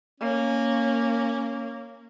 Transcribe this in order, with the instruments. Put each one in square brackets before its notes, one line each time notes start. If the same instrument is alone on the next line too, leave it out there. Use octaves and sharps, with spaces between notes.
[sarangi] A#3 [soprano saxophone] C#4